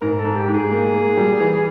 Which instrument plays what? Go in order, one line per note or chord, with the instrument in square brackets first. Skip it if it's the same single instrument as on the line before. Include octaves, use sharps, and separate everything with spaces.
[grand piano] G#2 [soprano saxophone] A#4
[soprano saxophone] A4
[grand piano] G#2
[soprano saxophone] G4
[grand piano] G#2
[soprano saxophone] G#4
[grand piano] A#3
A#3
G3
E3